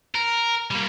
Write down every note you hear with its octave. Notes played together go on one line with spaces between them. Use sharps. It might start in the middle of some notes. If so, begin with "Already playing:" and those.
A#4
G3 A#3